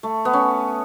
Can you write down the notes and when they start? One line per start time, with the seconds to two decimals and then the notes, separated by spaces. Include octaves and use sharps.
0.03 A3
0.25 B3
0.33 C#4